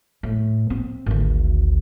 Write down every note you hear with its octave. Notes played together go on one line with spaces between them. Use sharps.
A2
C4
G#1 D2